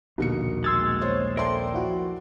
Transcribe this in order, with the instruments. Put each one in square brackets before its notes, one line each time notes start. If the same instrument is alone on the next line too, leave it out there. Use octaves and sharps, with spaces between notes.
[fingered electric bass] A#1 D#2 [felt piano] B2 A#4 C#7 [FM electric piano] D3 A#3
[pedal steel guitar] G#3 E6 [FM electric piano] C6 G#6 A6
[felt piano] C5 C#5
[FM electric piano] A4 C5 E5 [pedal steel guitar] A#4 G5 [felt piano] D5 C6
[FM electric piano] F3 E4 F#4